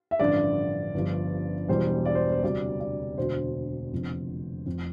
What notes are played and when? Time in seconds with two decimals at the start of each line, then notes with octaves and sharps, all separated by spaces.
0.11 E5
0.20 A1 G2 D3 F3 D5
0.94 G1 G2 F3
1.69 E1 E2 E3 G3 C5
2.05 D5
2.15 C5
2.32 C5
2.43 D2 C3 G3 D5
2.80 D5
3.18 E1 D2 D3 C5
3.92 F1 F2 D3
4.66 F1 F2 C3